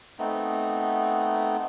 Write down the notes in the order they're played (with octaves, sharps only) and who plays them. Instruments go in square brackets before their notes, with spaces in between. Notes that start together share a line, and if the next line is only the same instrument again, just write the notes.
[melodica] A3 B3 C4 D#4